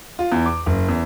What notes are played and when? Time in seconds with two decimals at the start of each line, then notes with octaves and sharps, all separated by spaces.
0.19 F4
0.32 E2
0.46 D6
0.66 F#1
0.89 E2